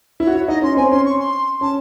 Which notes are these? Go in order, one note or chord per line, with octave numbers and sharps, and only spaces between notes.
E4 C#5
F#4
E4
D#4 D#5
C#4 C6
C4 G#5
C#4 C6
C#6
C6
C#4 A5